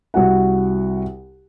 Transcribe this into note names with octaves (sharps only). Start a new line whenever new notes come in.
C2 F#4 F#5